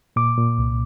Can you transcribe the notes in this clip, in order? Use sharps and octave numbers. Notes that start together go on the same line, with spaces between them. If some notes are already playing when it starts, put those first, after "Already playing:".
A#2 D6
A#2
C2